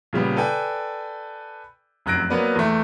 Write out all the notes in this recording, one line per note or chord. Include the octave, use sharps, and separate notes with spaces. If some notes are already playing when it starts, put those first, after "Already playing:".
A#2 C#3 G3 B3
A4 B4 D5 G5 G#5
F1 F#2 F#6 A#6 D7
F#3 A#3 B3 A#4 B4 D5
E2 A3